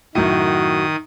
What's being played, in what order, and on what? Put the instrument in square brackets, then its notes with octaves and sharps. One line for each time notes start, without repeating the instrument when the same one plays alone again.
[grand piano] F#2 A2 [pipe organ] D#3 D#6 [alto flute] F#4